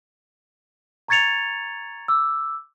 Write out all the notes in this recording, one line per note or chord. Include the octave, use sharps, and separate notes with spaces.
A#5 C#6 G#6 A6 C#7 F7
D6 E6